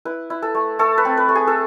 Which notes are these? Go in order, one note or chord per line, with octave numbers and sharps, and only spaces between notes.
E4 B4
E4
A4
A3
A3 A4
B4
C4
B4
A3
G#4
A4